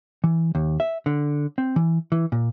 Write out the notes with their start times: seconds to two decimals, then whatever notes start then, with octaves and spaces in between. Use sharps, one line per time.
0.24 E3
0.55 D#2
0.80 E5
1.06 D3
1.58 C4
1.76 E3
2.12 E3
2.32 A#2